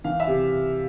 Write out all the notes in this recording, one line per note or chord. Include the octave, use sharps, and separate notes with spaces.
E3 F5
E5
C3